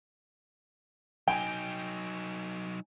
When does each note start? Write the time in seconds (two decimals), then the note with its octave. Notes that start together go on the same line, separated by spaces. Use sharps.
1.28 F#3 D#4 G5 G#5